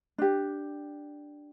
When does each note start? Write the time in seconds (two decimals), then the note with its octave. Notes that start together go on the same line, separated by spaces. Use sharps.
0.18 D4 G4